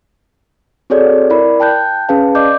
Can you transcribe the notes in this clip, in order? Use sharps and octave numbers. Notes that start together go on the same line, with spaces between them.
C4 F#4 G#4 A4 C#5 D5
E4 A#4 D5 B5
G5 A5 F#6 G6
C#4 G#4 B4 F5 A5
D5 D#5 D6 G6